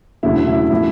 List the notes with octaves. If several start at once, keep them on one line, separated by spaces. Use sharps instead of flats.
E1 D2 C#3 F#3 E4
E4
A2 F3 E4